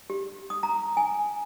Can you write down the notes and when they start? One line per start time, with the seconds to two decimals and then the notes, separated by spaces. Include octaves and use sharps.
0.10 G4
0.50 D#6
0.63 A#5
0.97 G#5